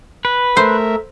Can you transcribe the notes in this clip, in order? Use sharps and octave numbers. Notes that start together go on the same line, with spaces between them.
B4
A3 A#4 C5 E5